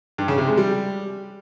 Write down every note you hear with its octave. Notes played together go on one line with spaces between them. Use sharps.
G2
C#3
C3
G#3
G3